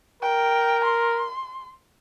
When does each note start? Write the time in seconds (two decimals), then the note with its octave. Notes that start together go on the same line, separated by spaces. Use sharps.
0.23 A#4 G5
0.85 C6